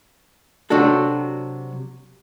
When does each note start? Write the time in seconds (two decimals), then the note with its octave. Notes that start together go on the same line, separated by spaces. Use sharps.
0.70 C3 F#3 D4 F#4 A4